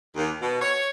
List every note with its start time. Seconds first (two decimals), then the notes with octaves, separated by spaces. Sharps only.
0.16 D#2
0.42 B2
0.61 C#5